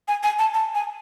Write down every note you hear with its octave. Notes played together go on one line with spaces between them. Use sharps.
G#5
G#5
A5
A5
G#5